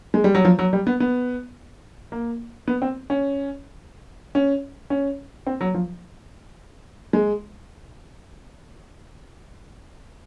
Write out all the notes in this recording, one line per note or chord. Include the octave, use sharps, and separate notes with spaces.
G#3
G3
F#3
F3
F#3
G3
B3
B3
A#3
B3
C4
C#4
C#4
C#4
C4
F#3
F3
G#3